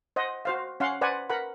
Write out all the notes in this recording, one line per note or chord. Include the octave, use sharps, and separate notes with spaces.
C5 D#5 F#5
F#4 C5 F5
C#4 F5 F#5 C6
B4 C5 D5 F#5 G#5
A#4 B4 F#5 B5